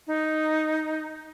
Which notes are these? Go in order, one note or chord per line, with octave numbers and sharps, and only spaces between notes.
D#4